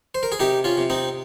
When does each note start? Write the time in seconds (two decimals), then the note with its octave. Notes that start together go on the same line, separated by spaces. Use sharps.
0.15 C5
0.23 A#4
0.32 G#4
0.40 C3 D#4 G4
0.64 C#4 F4
0.78 C3
0.90 C4 D#4